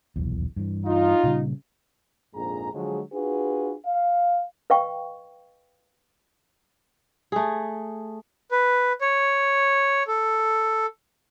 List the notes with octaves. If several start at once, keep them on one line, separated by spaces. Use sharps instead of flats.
D#1 B1 E2
G2 E3
D#4 F4
A#2 C#3 G3
A#1 F2 G#2 G#4 A#5
D3 F3 F#3 G#3
D4 F4 F#4 G#4 B4
F5
B4 D#5 F5 G5 C#6
A3 G#4
B4
C#5
A4